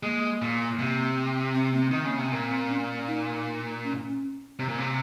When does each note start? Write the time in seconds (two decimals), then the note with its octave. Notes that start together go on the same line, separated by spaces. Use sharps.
0.03 G#3 A#3
0.42 A#2
0.80 C3
1.55 C4
1.74 A#3
1.80 C4
1.91 D#3
2.05 C#3 A#3
2.18 C3
2.32 A#2 C4
2.69 C#4
3.07 D#4
3.84 C#4
4.08 C#4
4.59 C3
4.68 A#2
4.78 C3